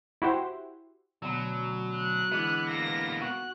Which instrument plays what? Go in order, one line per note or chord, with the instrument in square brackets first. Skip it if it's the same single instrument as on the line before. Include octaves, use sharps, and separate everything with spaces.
[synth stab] E4 F#4 G4 C5
[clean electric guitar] D2 B2 [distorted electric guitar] F#3
[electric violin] F#6
[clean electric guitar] D3 E3 G#3 [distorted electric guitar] B3
[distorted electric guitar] A#3 B3 [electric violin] A#6
[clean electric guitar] F#4 [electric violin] F#6